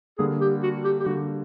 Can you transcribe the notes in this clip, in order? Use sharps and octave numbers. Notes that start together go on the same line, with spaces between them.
D3 G3 A#3 G#4
G4
F#4
G4
G4
D3 G3 A#3 F#4